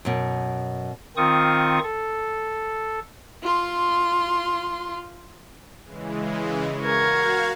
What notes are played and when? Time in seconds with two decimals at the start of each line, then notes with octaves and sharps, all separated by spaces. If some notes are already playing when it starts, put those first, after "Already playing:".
0.05 F#2 B2
1.17 D#3 C4 F4 C#6 D#6
1.83 A4
3.43 F4 C6
5.84 C#3 E3 G#3
6.83 F#4 A#4 F5 C#6 G#6